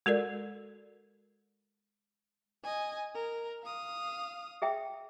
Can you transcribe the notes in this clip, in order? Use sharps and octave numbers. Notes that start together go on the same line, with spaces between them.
G#3 F#4 A4 A#4 D5
D#5 G#5
A#4
F5 D#6
G#4 E5 G5